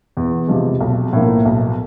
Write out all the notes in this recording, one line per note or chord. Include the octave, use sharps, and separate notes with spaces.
E2
C3 F3 G#3
B1
A2 F3 A#3
B1